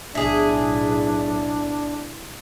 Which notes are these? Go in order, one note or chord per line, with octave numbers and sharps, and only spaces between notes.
B1 A2 D4 E4 G#4